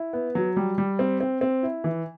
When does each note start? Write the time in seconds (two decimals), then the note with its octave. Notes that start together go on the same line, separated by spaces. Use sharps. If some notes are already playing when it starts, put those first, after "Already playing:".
Already playing: E4
0.13 B3
0.35 F#3
0.56 G3
0.78 G3
0.99 C4
1.21 C4
1.41 C4
1.63 E4
1.84 E3